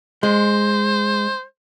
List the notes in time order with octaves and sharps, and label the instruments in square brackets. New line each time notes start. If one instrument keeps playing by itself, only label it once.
[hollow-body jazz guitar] G#3 [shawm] C5